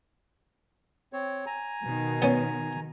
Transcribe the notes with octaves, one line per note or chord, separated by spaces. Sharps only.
C4 C#5
G#5 A#5
B2 D#3
B3 C#4